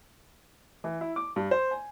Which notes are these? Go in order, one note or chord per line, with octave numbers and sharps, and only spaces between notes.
E3
E4
D6
G2
C5
G#5